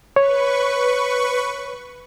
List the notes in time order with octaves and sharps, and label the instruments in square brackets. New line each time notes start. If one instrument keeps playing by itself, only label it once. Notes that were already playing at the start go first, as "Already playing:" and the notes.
[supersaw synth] B4 C#6 [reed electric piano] C#5